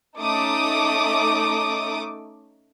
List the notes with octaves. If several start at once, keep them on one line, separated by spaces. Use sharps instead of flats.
A3 C#4 D#4 A4 D6 D#6